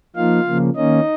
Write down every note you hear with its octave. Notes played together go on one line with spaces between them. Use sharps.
F3 A#3 D#4 F4 F5
C#3 F3 A#3
D#3 A#3 C#4 D#4 D#5